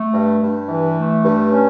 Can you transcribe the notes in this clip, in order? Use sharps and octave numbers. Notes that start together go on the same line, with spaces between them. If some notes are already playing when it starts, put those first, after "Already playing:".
Already playing: A3
G2
G2
E3
A3
G2
C#4